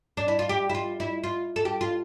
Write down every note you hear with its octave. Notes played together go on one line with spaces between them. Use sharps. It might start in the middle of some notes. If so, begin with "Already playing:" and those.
D4
E4
F4
G4
E4
F4
E4
F4
A4
G4
F4